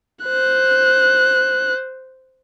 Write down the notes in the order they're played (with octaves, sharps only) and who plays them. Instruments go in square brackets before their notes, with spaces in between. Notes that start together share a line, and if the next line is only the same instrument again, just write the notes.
[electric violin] C5 F#6